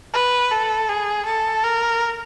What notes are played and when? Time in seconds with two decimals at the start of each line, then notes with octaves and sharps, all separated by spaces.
0.13 B4
0.51 A4
0.89 G#4
1.25 A4
1.63 A#4